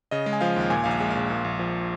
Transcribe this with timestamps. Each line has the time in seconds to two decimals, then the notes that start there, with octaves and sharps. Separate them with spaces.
0.11 C#3 D#5
0.26 G#3
0.33 G#5
0.41 F3 F5
0.56 D#2 F5
0.70 A#2 G#5
0.84 A#1 F5
0.91 G#5
1.00 G#3
1.10 A#1 F5
1.30 A#2
1.45 A#1
1.59 F3